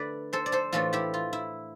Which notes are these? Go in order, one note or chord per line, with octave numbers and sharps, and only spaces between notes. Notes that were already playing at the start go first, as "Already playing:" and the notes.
Already playing: D3 A3 B4 D5
A4 C5
D5
A4 C5
A2 E3 A3 D4 F4 A4
E4 G4
F4
E4